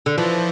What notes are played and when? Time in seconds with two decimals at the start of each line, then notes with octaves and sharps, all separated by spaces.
0.06 D3
0.18 E3 F3